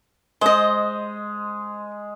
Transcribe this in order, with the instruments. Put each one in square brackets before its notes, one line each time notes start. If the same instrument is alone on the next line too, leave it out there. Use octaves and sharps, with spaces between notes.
[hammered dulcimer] G#3 [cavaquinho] C5 D#5